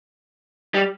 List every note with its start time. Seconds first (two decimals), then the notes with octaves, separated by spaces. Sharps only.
0.74 G3